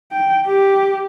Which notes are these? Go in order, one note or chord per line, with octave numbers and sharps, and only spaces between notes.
G5
G4